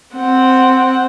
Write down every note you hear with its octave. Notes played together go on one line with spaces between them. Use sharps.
C4 F#5